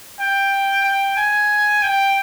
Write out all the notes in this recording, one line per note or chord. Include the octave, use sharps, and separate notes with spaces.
G5
G5
G#5
G5